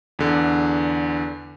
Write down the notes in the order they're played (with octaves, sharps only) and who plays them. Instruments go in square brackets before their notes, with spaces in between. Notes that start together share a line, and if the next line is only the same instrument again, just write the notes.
[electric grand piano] E2 D3